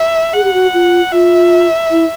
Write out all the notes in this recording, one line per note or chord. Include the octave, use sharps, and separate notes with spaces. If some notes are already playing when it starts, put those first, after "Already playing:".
Already playing: E5
G#4 F#5
G4
F#4
F4
F4 E5
E4